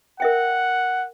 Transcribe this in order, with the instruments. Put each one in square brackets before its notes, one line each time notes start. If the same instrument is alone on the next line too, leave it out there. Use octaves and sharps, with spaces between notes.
[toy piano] A#4 E5 G5 [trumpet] F#5